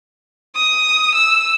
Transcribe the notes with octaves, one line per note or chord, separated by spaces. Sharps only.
D#6
E6